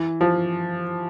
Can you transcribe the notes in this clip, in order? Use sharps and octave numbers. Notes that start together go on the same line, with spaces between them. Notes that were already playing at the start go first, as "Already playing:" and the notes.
Already playing: E3
F3